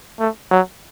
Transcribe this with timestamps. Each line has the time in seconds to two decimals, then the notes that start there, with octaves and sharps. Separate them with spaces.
0.19 A3
0.51 F#3